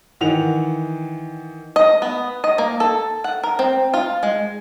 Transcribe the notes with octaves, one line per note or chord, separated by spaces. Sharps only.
D#3 E3 F#5 F7
D#5
B3
D#5
A#3
A4
F#5
A#4
C4
F4
G#3